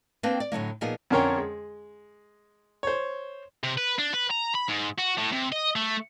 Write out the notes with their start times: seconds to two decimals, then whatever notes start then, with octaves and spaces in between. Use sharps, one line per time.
0.23 A#3 C4 D4 B4 G5
0.40 D5
0.52 A2 D3 F#3 A#3
0.81 A#2 F3 A#3 B3 D#4 G#4
1.10 F2 D3 C#4 A#4 C#5 G5
1.37 G#3
2.83 C5 C#5
3.64 C3
3.78 B4
3.99 D4
4.14 B4
4.31 A#5
4.55 B5
4.69 G#2
4.99 F#4
5.18 A2
5.32 C3
5.52 D#5
5.76 A3